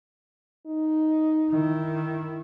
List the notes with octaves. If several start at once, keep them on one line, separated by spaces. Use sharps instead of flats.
D#4
D#3 E4